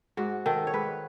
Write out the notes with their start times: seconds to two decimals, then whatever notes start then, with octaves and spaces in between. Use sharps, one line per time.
0.17 G#2 F#4
0.46 D#3 A4
0.67 C#5
0.74 G#2 B4